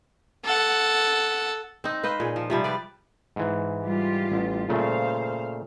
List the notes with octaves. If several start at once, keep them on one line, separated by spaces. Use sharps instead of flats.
A4 F#5
C4 D#4
B4 C5 D#5 F5
A#2 G#4
F3
C3 F3 G3
B4 D5
G#2 E3
G3 F4 G4
A1
A#2 C#3 A3 C5 F5